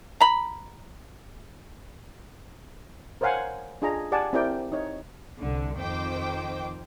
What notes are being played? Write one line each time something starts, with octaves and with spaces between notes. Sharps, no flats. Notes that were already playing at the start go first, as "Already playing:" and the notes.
A#5 B5
A#4 C5 C#5 F5 F#5 G#5
D4 F4 G#4 D#5 A#5
G4 D5 F#5 G#5 A5
C4 E4 G4 A#4 D5 G5
D#4 C#5
C2 D3
F2 D#3 C5 G5 D6